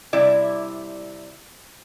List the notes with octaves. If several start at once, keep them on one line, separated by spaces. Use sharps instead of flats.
C3 G3 E4 D5 E5